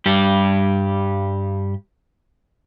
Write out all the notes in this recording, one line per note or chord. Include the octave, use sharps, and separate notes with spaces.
G2 G3 G4